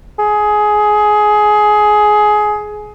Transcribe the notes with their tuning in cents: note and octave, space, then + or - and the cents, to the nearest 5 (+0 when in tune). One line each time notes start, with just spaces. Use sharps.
G#4 +15